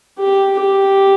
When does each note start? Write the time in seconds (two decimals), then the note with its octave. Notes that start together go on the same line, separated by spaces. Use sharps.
0.19 G4
0.60 G4